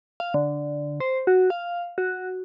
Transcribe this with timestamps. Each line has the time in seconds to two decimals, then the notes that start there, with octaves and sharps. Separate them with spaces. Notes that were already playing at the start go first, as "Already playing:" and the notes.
0.20 F5
0.34 D3
1.00 C5
1.27 F#4
1.50 F5
1.98 F#4